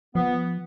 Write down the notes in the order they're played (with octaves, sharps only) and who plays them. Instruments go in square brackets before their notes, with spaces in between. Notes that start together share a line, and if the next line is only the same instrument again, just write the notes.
[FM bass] F3 [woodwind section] B3